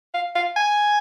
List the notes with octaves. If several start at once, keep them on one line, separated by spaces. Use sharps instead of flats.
F5
F5
G#5